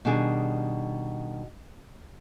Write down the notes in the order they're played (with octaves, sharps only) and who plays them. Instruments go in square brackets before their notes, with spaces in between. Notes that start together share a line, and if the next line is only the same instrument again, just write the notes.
[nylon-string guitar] B2 D#3 G3 D4 G#4